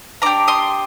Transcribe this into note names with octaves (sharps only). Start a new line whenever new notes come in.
D4 G4 A#5 D6
C6 D#6